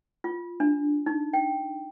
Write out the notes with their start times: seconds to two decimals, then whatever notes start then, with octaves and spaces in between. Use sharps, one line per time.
0.24 F4
0.60 D4
1.06 D#4
1.33 G5